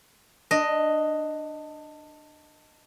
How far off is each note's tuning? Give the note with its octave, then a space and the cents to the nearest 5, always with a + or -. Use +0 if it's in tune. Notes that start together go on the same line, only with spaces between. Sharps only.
D4 +20 D#5 +0